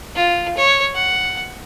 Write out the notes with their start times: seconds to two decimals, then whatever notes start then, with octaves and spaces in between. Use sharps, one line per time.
0.16 F4
0.57 C#5
0.95 F#5